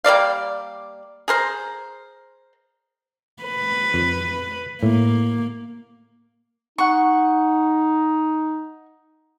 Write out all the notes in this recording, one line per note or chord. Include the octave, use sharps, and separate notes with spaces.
G3 A#3 D5 F5
G#4 A#4 C5
B4
F2
A2 A#3
D#4 F#5 C#6